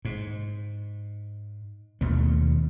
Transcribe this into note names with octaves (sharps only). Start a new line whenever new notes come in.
G#2
D#2 B2 A3